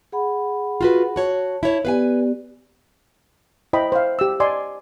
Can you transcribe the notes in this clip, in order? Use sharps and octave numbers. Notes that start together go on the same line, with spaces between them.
G#4 F#5 B5
F4 F#4 B4
F#4 C#5 A5
E4 C#5
B3 G4 B4 D5 F5 G#5
E4 C5 D#5 G5 B5
C5 E5 F5
G4 E6
D5 D#5 G#5 C6